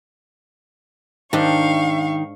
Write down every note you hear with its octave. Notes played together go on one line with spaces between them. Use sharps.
G#2 D#3 D4 G4 F5 C#6